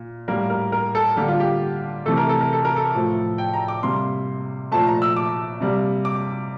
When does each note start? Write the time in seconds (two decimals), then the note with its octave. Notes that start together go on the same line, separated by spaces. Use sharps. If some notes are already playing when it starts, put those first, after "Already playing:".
Already playing: A#2
0.28 A2 G3 A#3 A#4
0.50 A#4
0.72 A#4
0.95 A4
1.16 D3 G3 A#3 G4
1.28 F4
1.40 G4
2.06 C3 E3 A3 A4
2.17 A#4
2.29 A4
2.41 A#4
2.53 A4
2.65 A#4
2.76 A4
2.94 A2 F3 A3
3.38 G5
3.53 A#5
3.68 D6
3.83 C3 G3 A#3 C6
4.71 A#2 F3 A3 A5
4.87 A#5
5.02 E6
5.16 D6
5.61 C3 G3 A#3
6.05 D6